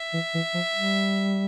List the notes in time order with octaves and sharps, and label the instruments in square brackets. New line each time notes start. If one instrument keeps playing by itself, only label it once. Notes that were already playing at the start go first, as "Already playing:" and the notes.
Already playing: [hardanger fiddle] E5
[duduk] E3
E3
F3
G3